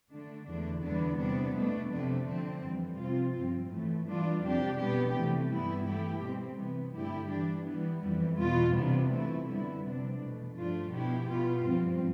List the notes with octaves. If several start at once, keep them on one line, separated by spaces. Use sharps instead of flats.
D3 A3 D4
E2 D3 A3 D4
E2 D3 G3 B3 D4
C3 G3 B3 D4
B2 A3 D4
F2 C3 F3 A3 D4
D3 F3 C4
F2 E3 G3
C3 F3 C4 F4
G2 F3 C4
A2 E3 A3
E3 G3 D4 F4
F2 C3 G3 D4 G4
B2 B3 D4 G4
C3 E3 A3
G2 E3 G3 B3 E4
E3 A3 E4 G4
B2 G3 C4
C3 E3 B3
G2 D3 A3 E4 G4
E3 G3 D4
E3 G3 B3
F2 E3 G3
E2 B2 B3 F4
C3 E3 G3 B3 D4
E3 A3 E4
F2 D3 G3 B3 E4
C3 G3 D4
E2 B2 A3
G2 F3 A3 D4 F4
B2 B3 E4 G4
B2 B3 F4
G2 F3 C4